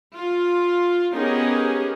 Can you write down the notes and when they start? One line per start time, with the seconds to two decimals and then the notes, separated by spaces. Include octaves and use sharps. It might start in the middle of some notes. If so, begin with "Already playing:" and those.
0.16 F4
1.15 B3 C#4 D#4 G4 G#4 A#4